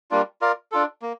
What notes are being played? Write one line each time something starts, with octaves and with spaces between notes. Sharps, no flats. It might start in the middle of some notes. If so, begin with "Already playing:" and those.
G3 A#3 D4 F4
F4 A#4 D5 F5
D4 F4 A4
A#3